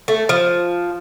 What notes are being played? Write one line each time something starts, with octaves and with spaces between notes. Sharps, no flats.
A3
F3